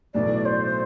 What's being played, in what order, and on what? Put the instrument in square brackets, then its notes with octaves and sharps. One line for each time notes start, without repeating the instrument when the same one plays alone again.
[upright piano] B1 A2 E3 A3 E4 [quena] D5
[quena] C5